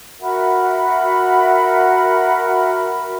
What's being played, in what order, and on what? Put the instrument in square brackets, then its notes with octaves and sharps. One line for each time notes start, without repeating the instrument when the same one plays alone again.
[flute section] F#4 A#4 E5 B5